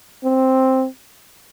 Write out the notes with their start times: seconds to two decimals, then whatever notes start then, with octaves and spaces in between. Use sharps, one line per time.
0.24 C4